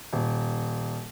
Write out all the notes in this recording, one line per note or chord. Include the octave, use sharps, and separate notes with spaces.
D#1